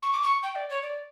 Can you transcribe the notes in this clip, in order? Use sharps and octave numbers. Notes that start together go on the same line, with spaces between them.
C#6
D6
C#6
G5
D5
C#5
D5